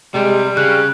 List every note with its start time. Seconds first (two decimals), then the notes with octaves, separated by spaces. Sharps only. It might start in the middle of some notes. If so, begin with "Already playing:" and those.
0.14 C3 G3 G#3
0.57 C#3 G#4 F#6